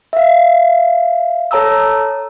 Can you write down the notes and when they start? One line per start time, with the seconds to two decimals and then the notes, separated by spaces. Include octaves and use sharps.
0.13 E5 F5
1.51 A4 C#5 A5 A#5 D#6 E6